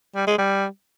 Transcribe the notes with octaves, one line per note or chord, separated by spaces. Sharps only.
G3
G#3
G3